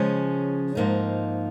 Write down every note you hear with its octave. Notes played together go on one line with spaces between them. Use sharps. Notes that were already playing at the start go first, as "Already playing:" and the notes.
Already playing: C#3 F3 G#3 C#4
G#2 F3 A#3 D#4